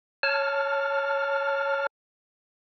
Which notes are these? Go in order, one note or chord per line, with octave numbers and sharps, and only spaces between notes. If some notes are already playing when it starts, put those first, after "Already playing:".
C#5 A5 F6